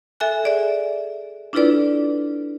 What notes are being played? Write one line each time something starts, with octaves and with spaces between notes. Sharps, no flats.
A4 E5 G#5 F#6
G#4 D5 E5
D4 E4 F4 A4 B4 D5